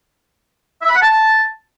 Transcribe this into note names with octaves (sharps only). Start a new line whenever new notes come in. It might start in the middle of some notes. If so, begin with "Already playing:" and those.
E5
B5
F#5
A5